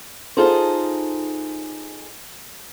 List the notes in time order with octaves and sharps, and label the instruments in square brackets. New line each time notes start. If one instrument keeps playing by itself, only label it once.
[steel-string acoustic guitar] D#4 F4 G#4 A4 C5